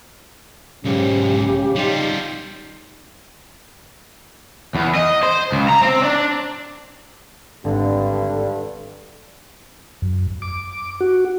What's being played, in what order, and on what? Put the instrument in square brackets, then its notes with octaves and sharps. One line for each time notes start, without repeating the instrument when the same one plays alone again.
[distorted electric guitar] B1 G#2 [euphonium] C#3 [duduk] G4
[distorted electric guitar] G3 F4 [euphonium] D#4
[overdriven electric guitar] E2
D#5
C5
C#2
A#5
C4
D4
[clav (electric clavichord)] G#1 [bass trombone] G2 [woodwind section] D3
[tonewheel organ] F#2
D6
F#4